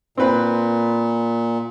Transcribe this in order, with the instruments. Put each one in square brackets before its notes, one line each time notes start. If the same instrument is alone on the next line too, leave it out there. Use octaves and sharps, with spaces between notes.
[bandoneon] A#2 [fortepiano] C4 B4